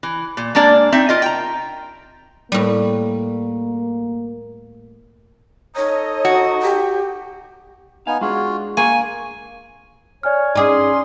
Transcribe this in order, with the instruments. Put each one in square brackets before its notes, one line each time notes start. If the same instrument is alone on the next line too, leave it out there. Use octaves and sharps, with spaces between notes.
[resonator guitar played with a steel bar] E3
A#2
G#3 A#3 D4 D5
C4 D#4 E5
F4 A#4 D#5
G5 A#5
[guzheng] A2 G3 [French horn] A#3
[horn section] D#4 A4 D#5 [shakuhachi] C#5
[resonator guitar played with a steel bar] F#4
[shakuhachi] G4
[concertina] B3 D#4 G#5 [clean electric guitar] F5
[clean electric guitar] G#3 D4 G#4 [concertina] F4 F#4
[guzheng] A#3 [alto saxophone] G#5 [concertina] C#6
[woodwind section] C#5 [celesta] D5 G#5 F6
[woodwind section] C#4 C6 [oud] D#4 G#4 [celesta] D5 D6 D#6